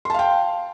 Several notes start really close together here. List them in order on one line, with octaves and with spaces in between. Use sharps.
C6 A5 F5 G5